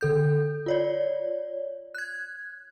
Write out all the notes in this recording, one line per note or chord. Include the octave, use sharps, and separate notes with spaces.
D3 A4 G6
F4 C#5 D5
F#6 G#6